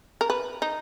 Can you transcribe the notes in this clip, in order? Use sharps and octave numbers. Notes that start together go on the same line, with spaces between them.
A#4
B4
D#4